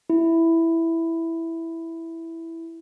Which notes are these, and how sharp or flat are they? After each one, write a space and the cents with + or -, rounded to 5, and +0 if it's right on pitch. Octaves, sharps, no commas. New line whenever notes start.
E4 +0